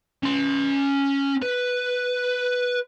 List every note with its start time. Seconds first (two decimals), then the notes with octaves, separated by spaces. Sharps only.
0.23 C#4 C6
1.42 B4